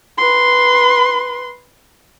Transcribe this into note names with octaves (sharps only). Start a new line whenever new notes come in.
B4 C6